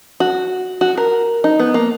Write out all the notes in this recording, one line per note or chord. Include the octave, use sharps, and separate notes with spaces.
F#4
F#4
A#4
D#4
B3
A#3